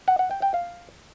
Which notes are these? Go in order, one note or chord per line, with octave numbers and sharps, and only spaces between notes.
F#5
F#5
G5
G5
F5